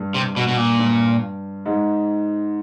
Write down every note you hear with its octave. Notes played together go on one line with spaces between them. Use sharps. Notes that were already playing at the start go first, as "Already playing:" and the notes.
Already playing: G2
C3
B2
B2
A#2
G2
G#2